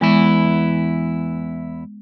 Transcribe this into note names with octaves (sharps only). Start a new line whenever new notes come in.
E2 E3 G#3 B3 E4